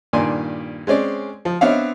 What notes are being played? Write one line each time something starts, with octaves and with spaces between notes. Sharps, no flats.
G2 A#2 D#3 D5 G#5 C6
G#3 C4 C#4 D5
F3
B3 C4 D4 C#5 E5 F5